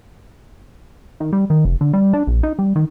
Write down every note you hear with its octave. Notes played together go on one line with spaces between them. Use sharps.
D#3
G3
D#3
F1
D3
G3
D4
A#1
D#4
G3
D#3